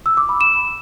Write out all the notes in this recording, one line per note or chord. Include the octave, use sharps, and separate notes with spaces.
E6
D6
B5
E7